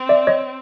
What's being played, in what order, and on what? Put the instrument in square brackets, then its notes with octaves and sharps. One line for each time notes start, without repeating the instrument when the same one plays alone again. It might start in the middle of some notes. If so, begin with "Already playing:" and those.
Already playing: [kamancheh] C4
[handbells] D5 E5
C#5 D#5